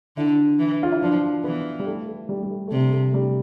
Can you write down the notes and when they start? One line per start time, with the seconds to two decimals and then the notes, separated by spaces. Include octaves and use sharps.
0.17 D3 E4
0.59 E3
0.83 F4
0.92 E4
1.02 F3 D4
1.44 E3 B3
1.79 G3
1.86 A3
2.08 A3
2.29 G3
2.43 G3
2.50 A3
2.67 A3
2.71 C3 G3
2.92 A3
3.14 G3